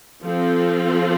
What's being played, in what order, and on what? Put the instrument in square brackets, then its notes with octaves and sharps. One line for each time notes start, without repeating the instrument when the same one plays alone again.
[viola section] F3 C4 F4 A4